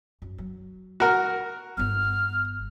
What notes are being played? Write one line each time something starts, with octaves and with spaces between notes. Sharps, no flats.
F#2
F#3
F#4 A#4
G1 B3 F6